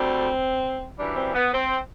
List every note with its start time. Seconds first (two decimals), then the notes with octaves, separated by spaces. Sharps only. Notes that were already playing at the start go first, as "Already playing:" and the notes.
Already playing: D2 D3 G3 C4
0.98 F#2 E3 G3 D4
1.16 C4
1.35 B3
1.53 C4